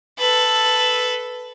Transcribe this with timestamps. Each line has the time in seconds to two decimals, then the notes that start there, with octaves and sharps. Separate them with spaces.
0.19 A4 B4